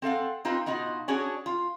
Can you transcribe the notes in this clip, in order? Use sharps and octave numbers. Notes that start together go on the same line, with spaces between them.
C4 A4 F5 F#5
C4 D#4 F4 B4
B2 D#4 F4 F#4
C#4 D4 F#4 G#4 C#5
F4